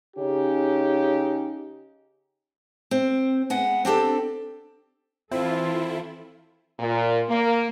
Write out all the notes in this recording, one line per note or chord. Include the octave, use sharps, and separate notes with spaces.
C#3 C#4 D#4 G4
C4
G#3 B3 F#5
C4 D4 G4 A4
E3 C4 E4 F4 A4
A#2
A#3